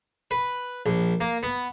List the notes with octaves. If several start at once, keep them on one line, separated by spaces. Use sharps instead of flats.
B4
A#1
A#3
B3